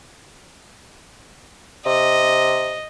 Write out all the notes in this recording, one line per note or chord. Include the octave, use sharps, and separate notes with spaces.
C3 D#5